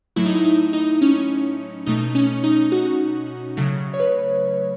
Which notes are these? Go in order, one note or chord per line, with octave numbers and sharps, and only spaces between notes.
A2 F#3 A3 E4
D#4
E4
D#4
D#4
C#4
B2 A3 D#4
C#4
D#4
F#4
C#3 F#3 A3
C#5
B4